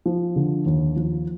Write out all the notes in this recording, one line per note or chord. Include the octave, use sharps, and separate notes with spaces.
F3
D3
D#2
F3